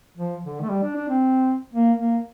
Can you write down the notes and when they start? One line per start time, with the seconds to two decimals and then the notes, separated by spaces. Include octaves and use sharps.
0.17 F3
0.43 D3
0.61 A3
0.69 G3
0.83 D4
0.96 D4
1.09 C4
1.73 A#3
1.99 A#3